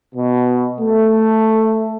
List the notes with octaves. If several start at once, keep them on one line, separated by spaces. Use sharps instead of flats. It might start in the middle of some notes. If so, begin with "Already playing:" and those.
B2
A3